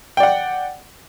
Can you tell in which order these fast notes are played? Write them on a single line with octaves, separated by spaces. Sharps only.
G5 D5 F#5